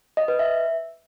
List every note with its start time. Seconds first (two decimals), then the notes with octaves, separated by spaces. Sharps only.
0.17 D#5
0.28 B4
0.39 E5